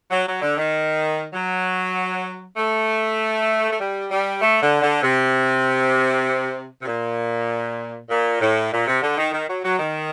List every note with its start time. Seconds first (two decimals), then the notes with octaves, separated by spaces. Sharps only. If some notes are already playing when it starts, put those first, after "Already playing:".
0.11 F#3
0.27 F#3
0.41 D3
0.57 D#3
1.34 F#3
2.57 A3
3.70 A3
3.80 G3
4.10 G3
4.42 A3
4.61 D3
4.82 D3
5.02 C3
6.82 C3
6.87 A#2
8.10 A#2
8.41 A2
8.72 A#2
8.87 C3
9.02 D3
9.18 D#3
9.32 D#3
9.48 F#3
9.64 F#3
9.79 D#3